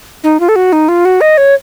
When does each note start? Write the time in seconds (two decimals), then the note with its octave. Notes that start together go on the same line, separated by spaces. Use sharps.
0.24 D#4
0.40 F4
0.49 A4
0.56 F#4
0.73 D#4
0.88 F4
1.05 F#4
1.21 D#5
1.38 C#5